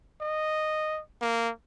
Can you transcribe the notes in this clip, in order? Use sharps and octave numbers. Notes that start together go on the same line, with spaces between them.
D#5
A#3